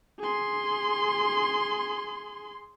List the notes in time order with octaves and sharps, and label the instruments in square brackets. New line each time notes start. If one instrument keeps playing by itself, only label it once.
[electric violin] G#4 C6